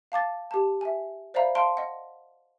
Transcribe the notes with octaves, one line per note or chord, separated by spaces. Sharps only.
F5 A5 D6 A6
G4 A5
E5 G#5
C5 D5 E5 F5 A#5 B5
F5 A5 C6 D7
D#5 F#5